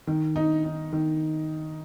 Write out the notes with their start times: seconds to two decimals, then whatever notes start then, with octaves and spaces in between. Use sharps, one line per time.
0.07 D#3
0.36 D#4
0.64 D#4
0.93 D#3